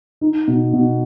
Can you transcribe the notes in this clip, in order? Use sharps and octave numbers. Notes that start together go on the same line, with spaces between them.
D#4
B2
B2